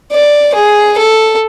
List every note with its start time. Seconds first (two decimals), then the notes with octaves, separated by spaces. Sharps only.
0.12 D5
0.55 G#4
0.98 A4